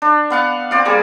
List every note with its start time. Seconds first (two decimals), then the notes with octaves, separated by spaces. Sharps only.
0.02 D4
0.30 B3 F5 F#5
0.71 C4 D5 F5
0.85 G3 A#3 G#4